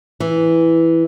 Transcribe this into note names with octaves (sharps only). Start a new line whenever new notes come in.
E3